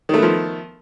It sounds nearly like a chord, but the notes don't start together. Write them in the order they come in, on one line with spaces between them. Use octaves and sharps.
D#3 A3 B3 F3